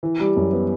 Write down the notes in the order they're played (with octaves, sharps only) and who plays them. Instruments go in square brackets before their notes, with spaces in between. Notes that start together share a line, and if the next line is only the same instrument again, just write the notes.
[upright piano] E3
G3
F#2
B3